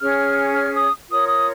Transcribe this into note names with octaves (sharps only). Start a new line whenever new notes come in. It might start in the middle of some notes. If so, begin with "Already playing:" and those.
C#4 G#4 C#5 F6
F6
D#6
F4 A#4 C#5 D#6
D#6